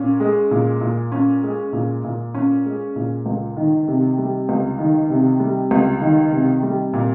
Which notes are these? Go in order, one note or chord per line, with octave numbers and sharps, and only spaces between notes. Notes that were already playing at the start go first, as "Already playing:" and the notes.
Already playing: A#2 C#4
G#3
A#2
A#2
C#4
G#3
A#2
A#2
C#4
G#3
A#2
C#2
D#3
C3
G3
C#2
D#3
C3
G3
C#2
D#3
C3
G3
A#2